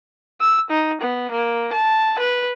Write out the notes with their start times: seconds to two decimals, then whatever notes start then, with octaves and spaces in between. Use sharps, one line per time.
0.41 E6
0.70 D#4
1.01 B3
1.31 A#3
1.73 A5
2.19 B4